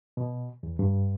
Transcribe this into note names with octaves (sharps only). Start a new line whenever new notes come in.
B2
E2
G2